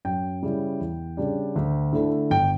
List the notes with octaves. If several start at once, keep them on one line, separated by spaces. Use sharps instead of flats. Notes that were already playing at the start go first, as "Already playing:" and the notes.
F#2 G5
C#3 G3 C#4 E4
E2
C#3 G3 D4
D2
D3 A3 E4
G1 G5